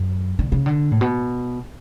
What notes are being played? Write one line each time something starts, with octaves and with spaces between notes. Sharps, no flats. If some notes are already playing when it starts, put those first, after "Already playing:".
Already playing: F#2
D3
C#3
D3
A2
B2